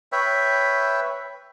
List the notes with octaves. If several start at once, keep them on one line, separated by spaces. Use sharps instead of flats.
B4 C#5 E5 G5